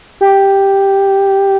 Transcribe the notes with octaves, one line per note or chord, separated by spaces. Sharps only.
G4